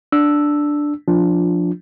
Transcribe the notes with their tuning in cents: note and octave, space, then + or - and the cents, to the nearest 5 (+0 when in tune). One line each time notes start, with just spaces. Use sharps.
D4 +0 E6 +0
F3 +15 D4 +0 F4 +0